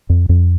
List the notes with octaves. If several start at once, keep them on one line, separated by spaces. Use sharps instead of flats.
F2
F2